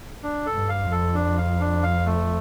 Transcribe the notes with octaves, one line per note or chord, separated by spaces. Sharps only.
D4
A4
G2
F5
F2
A4
D4
F5
D4
F5
A3